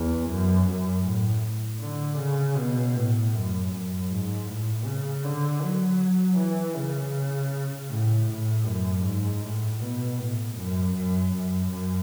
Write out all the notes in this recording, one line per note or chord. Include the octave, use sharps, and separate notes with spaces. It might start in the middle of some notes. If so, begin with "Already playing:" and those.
Already playing: E2
F#2
F#2
A2
D3
C#3
B2
A2
F#2
F#2
G#2
A2
C#3
D3
F#3
E3
C#3
A2
A2
F#2
G#2
A2
B2
A2
F#2
F#2
F#2
F#2